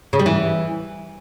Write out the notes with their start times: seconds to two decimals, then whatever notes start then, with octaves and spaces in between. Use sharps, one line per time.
0.13 C#3
0.19 G3
0.26 E3